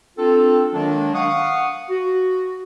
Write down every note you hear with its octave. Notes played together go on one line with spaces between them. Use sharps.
C4 D4 F4 A4
D#3 F#3 G#3 A#3 D4
F5 F#5 C#6 D#6
F#4